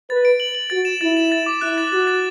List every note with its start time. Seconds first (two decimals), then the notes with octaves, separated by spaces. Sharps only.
0.09 B4 A6
0.25 D7
0.40 F#7
0.55 F#7
0.70 F#4 A6
0.85 E7
1.01 E4 A6
1.17 E7
1.32 A6
1.46 D6
1.61 E4 F#6
1.78 A6
1.92 F#4 A6
2.07 A6